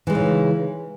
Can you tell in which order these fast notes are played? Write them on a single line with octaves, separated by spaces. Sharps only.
E3 G#3 D#4 C#3